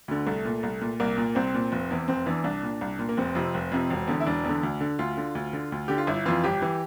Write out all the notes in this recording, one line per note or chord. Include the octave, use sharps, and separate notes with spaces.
D2 D3
C2 A3
A#2
C2
A#2
C2 A#3
A#2
C2 C4
A#2
F1
E2 E3
F1 C4
E2 E3 D4
C2 D4
A#2
C2
A#2
A#3
F1 C4
F2 C3
F1
F2 C3
E1
E2 D3
E4
E1 D4
E2 D3
D2
D3
D2 F4
D3
D2
D3
D2
D3 G4
F4
G1 E4
F2 E3 F4
G1 G4
E3